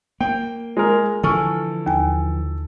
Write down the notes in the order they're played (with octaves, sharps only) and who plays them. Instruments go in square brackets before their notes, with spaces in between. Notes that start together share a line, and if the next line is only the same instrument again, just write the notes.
[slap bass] A#3 [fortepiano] G5
[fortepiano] G#3 A#4
[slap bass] D3 E3 F3 [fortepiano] A4 [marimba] G#5 C#6 F6
[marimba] D#2 G#5